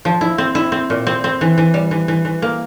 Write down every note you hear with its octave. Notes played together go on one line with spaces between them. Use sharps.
F3
E4
C4
E4
C4
A#2
C4
C4
E3
E3
G3
E3
E3
E3
A#3